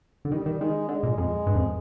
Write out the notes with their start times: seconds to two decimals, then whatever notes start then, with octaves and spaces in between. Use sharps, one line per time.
0.25 D3
0.32 D#3 G3
0.46 D#3
0.60 D#3 G#3
0.89 D3 G#3
1.03 A#2
1.18 F2 G#3
1.47 G2
1.55 F2